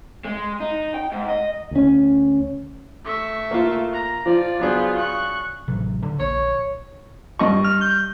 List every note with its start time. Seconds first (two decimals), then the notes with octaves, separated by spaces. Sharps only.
0.25 G#3
0.60 D#4
0.94 G5
1.12 G#2
1.29 D#5
1.71 D2 C#4
3.05 A3 E5 C#6
3.51 A#3 F4
3.93 A#5
4.26 F3 F4 D5
4.60 F#3 B3 D4 G#4 C5
4.96 C#6 F#6
5.68 A1 C3 F#3
6.02 D3
6.20 A#1 C#5
7.39 G2 D#5 C#6
7.64 F6
7.81 G6